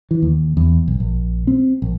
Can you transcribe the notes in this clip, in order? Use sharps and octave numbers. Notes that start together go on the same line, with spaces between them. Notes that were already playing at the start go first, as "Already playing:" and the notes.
E3
D#2
E2
B1
A#1
C4
A#1